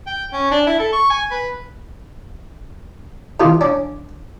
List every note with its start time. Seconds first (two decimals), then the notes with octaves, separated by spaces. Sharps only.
0.07 G5
0.33 C#4
0.51 D4
0.67 E4
0.79 A4
0.93 C#6
1.10 G#5
1.31 B4
3.40 C3 D#3 E3 F4
3.61 C#4 D4